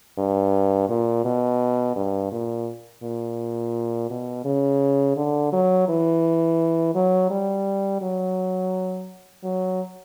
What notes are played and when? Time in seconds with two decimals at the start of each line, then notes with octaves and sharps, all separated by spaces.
0.18 G2
0.89 A#2
1.25 B2
1.96 G2
2.32 A#2
3.03 A#2
4.10 B2
4.45 C#3
5.17 D3
5.53 F#3
5.88 E3
6.95 F#3
7.30 G3
8.02 F#3
9.44 F#3